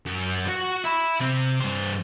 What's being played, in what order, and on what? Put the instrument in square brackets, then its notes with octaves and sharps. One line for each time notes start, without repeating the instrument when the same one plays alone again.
[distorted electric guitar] F#2
F#4 F#5
E5 B5
C3 C4
G2 C5